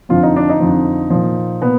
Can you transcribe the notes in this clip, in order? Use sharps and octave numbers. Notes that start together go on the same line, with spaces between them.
F2 D3 F3 F4
D#4
D4
D#4
F2 D3 F3
A#2 F3
A#2 B3